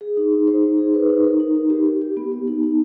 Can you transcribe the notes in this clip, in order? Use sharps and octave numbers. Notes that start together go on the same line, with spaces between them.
G#4
D#4
D#4
C5
D#4
G#4
B4
D#4
A#4
D#4
D#4
G4
G4
G4
B3
B3
D#4
D#4